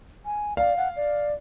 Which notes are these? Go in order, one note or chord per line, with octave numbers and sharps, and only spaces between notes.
G#5
D5 F5
F#5
D5